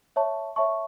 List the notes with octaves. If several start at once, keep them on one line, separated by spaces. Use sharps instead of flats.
C#5 E5 A5 C#6
C#5 E5 A5 C#6